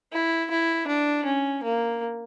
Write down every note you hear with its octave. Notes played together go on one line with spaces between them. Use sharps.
E4
E4
D4
C#4
A#3